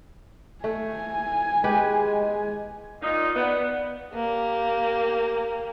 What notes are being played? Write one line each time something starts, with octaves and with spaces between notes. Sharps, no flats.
A3 G#5
G#3 G4 B4
A#2 D#4
B3 D5 F5
A#3 G4